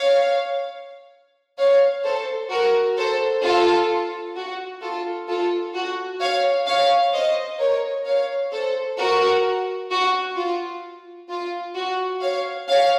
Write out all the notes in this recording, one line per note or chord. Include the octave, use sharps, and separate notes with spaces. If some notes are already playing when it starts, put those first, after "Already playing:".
Already playing: C#5 F5
C#5 F5
A4 C5
F#4 A#4
A4 C5
F4 A4
F#4
F4 A4
F4 A4
F#4
C#5 F5
C#5 F5
C5 D#5
A#4 C#5
C#5 F5
A4 C5
F#4 A#4
F#4
F4
F4
F#4
C#5 F5
C#5 F5